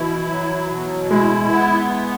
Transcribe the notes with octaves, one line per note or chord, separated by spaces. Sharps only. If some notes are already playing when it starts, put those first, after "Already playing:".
Already playing: B2 E3 E4
F#3
B2
G#3 E4
B3